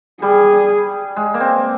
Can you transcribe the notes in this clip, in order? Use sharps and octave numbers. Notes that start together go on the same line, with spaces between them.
G3 G#4
G#3
A#3
C4